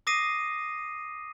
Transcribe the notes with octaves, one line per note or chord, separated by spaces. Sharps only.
D6 D#6 A#6 C7 D#7